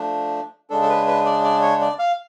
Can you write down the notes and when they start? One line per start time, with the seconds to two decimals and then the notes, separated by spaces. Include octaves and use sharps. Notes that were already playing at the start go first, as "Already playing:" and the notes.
Already playing: F3 A3 D4
0.70 C#3 G#3 D4 A4
0.83 A4
0.89 B4
1.07 B4
1.26 D5
1.44 D5
1.62 C#5
1.81 D5
1.99 F5